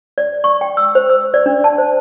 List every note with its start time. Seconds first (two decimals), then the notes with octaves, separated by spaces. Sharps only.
0.18 D5
0.44 C#6
0.61 G5
0.77 E6
0.95 C5
1.10 E6
1.34 D5
1.46 D4
1.64 A5
1.78 C5